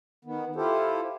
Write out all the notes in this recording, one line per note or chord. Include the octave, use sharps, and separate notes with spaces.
D#3 B3
E4 F4 G4 A4 C5